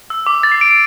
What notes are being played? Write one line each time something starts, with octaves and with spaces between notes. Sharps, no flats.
E6
D6
E6
A6
C7
D7